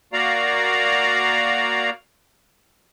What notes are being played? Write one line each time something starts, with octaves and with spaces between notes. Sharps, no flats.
A#3 F#4 D5 F5 A#5